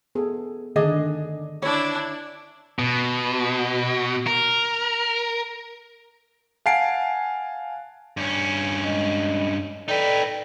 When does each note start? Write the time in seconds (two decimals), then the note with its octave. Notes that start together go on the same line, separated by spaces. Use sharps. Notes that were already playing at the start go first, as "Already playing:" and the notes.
0.15 B3 G#4 A4
0.76 D3 D#3 D4 G#4 D#5
1.62 D4 E4 C#5
2.79 B2
4.27 A#4
6.66 F5 F#5 G#5 A5 C7 D7
8.17 G2 C#4
8.85 G#3 D#5
9.88 D#4 A4 B4 D5 G5